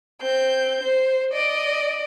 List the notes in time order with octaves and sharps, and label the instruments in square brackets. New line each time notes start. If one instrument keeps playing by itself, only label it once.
[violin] C4 G6
C5
D5 D#5